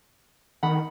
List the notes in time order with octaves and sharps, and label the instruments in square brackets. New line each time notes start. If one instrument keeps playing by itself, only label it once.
[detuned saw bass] D#3 [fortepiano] F#5 B5